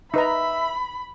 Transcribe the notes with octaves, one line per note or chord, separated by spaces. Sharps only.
D#4 B4 E5 A#5 B5